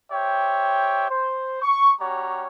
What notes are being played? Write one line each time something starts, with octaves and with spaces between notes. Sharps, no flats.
G4 C5 C#5 E5 G5
C5
C#6
G3 C#4 F#4 G4 C#5 A#5